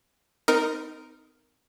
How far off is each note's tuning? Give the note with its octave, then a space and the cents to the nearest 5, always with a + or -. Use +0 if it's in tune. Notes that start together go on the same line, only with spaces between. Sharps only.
C4 -40 D#4 +0 A#4 +0